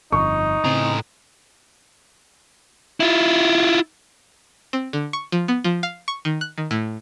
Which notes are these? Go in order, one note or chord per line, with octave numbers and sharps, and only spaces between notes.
G1 F2 D#4 C#6
A2 C#3 C4 A#5
E4 F4
C4
D3
C#6
F3
B3
F3
F5
C#6
D#3
F#6
D#3
A2